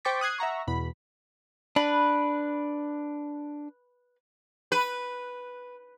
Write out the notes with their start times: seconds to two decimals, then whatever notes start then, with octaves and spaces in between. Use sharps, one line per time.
0.05 C5 G5 C#6 D6 A6 B6
0.21 D#6 F#6 G#6 C7
0.38 E5 F#5 A#5 C#6
0.67 E2 B2 B5
1.76 D4 B4
4.72 B4